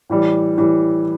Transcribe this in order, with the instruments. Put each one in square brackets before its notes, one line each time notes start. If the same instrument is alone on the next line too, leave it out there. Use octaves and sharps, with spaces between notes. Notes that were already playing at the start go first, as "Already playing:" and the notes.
[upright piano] A2 E3 G3
A2 E3 G3